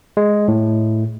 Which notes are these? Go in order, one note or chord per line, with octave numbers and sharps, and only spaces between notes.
G#3
A2